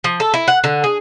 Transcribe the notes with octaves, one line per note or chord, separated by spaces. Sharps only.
F3
A4
E4
F#5
D3
G#4